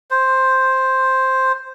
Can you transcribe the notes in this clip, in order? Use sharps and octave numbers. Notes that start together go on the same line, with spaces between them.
C5